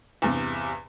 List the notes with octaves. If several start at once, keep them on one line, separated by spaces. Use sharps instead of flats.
E2 G2 C3